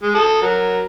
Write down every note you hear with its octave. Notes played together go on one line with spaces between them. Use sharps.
G#3
A4 D#6
F#3 A#4